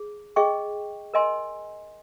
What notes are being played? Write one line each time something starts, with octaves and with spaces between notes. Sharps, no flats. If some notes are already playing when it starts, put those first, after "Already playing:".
Already playing: G#4
G#4 D#5 G5 C#6
A#4 D#5 G#5 C6